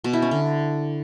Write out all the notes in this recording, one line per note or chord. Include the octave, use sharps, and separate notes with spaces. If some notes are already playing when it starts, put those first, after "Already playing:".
B2
E4
C#4
D3